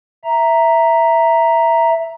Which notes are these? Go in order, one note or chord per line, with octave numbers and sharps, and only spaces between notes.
E5 A#5